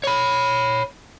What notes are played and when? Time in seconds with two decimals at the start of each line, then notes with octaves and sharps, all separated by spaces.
0.04 C#5 B5